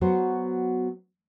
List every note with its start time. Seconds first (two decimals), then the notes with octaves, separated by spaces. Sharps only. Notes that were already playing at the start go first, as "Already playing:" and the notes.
0.01 F#3 B3 F#4 C5 C#5